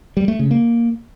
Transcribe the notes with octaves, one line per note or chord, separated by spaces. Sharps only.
G3
A3
C#3
A#3